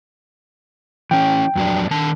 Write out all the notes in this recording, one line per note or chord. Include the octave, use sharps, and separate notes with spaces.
E3 C#4 G5
F2 F#3 D4
D#3 D4 A5